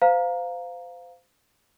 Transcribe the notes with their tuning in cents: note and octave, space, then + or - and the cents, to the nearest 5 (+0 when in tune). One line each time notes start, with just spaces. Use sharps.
C5 -30 F5 +5 A#5 +0